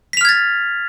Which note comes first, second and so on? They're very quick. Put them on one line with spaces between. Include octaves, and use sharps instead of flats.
B6 F7 F6 G#6 A6